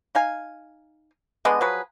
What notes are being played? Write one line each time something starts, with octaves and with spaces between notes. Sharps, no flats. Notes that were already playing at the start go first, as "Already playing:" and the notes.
D#4 F5 G#5
D3 G#3 B3 D#5
F3 F#3 G#4 B4